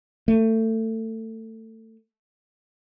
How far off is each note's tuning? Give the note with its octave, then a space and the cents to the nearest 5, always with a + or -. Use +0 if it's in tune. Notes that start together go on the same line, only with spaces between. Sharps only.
A3 +25